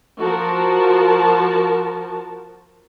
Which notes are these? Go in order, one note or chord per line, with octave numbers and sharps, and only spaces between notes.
F3 F#4 A#4 A5